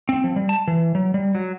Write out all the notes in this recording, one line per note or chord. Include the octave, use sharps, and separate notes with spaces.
C4
F3
G3
A5
E3
F#3
G3
F#3